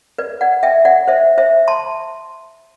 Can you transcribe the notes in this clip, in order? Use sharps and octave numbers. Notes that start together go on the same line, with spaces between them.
B4 D5
D5 F#5
E5 G5
D5 F#5
C5 E5
C5 E5
A5 C6